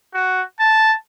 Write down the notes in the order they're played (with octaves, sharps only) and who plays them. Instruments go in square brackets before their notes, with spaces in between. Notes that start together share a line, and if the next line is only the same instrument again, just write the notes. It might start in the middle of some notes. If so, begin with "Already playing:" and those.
[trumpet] F#4
A5